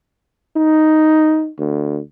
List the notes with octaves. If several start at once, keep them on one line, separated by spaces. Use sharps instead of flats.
D#4
D2